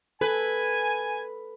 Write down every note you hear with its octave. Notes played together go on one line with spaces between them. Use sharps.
A4 B4 G#5